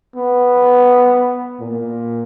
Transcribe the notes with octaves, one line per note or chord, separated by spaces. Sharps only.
B3
A#2